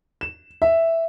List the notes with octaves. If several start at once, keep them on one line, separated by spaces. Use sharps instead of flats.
E7
E5